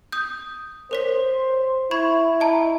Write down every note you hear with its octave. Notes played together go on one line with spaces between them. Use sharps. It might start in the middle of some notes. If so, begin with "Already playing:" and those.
D#6 G6
A#4 C5 C#5 B6
E4 B5 C#6 G#6
D#5 A5 A#5